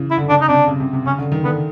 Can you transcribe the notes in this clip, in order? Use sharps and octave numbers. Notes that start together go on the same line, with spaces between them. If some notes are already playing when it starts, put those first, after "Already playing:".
Already playing: C#3 E3
E4
D3
C#3 D4
D#4
C3 D4
C#3
C3
C3
C#3 C#4
D3
D#3
D3 B3